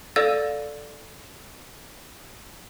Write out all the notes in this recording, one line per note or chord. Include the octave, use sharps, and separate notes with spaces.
A4 D5 F5 E6 A6 D#7